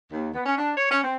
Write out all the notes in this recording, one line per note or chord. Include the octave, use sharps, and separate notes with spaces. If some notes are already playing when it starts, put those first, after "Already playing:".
D#2
B3
C#4
D4
C#5
C#4
C4